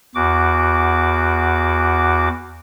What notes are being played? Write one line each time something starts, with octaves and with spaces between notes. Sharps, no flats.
E2 F#4 D6